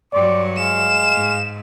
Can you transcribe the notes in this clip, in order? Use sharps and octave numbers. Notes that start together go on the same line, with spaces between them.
G2 F#3 D5 G5 C6 D6
G#3 F5 E7
G#2